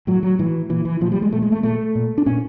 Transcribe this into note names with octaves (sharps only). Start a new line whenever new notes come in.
A2 F#3
F#3
A2 E3
A#2 E3
E3
A#2 F3
G3
G#3
A#2 A3
G#3
A3
A#2 A3
A#2
D4
A#2 C#4